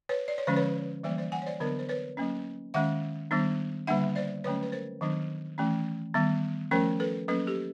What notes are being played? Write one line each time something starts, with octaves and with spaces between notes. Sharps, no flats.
B4 C#5
D5
C#5
D3 F3 G#3 C#4 C5
B4 C#5
E3 G3 A#3 C5 D5
C5 D5
F#5 G#5
C#5
C5 D5
D3 F#3 B3 D4 A#4 C5
C5
B4 C#5
F#3 A#3 C#4
D#3 G#3 C#4 E5 F#5
D#3 G3 B3 D4
D3 G3 A#3 D4 E5 F#5
C5 D5
D3 F#3 A3 C#4 B4 C#5
B4
A#4 C5
D#3 F#3 B3 D4
E3 A3 C#4
D#3 G3 B3
F3 A3 C#4 A#4 C5
A4 B4
F#3 A#3 C#4 A4 B4
G4 A4